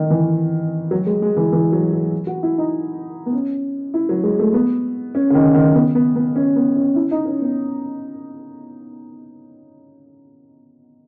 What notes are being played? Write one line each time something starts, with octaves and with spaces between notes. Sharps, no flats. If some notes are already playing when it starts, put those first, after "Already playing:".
Already playing: D#3
E3
F#3
G#3
G#3
E3
E3
F#3
F#3
F#4
E4
D#4
B3
C#4
E4
F#3
G#3
A3
B3
C#4
C#3
D#3
D#3
B3
B3
B3
C#4
B3
C#4
E4
D#4
C#4
B3